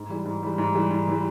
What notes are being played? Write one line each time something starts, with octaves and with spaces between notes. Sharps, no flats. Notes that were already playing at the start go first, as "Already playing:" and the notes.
Already playing: G#2
E3 G3
G#2
E3 G3
G#2
E3 G3
G#2
E3 G3